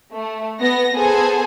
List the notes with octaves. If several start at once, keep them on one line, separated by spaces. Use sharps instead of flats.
A3
B3 A#6
B3 G#4 A4 C5 G#5